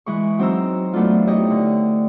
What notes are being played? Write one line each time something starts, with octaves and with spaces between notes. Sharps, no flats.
E3 G#3 C#6
F#3 C4 D#4 C5 A#5 E6
E3 F#3 A3 B3 D4 F4
D#4 E4 G4 C#5 D#5
D3